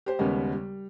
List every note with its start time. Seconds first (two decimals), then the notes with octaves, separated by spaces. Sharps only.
0.06 G4 C5
0.19 D#2 C#3 G3 G#3 B3
0.52 G3